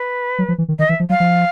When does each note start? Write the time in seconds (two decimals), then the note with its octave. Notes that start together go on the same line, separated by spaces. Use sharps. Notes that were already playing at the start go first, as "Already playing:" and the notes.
Already playing: B4
0.39 F#3
0.48 F3
0.58 E3
0.68 D#3
0.79 D#3 D#5
0.89 E3 E5
1.00 F3
1.09 F#3 F5
1.20 F3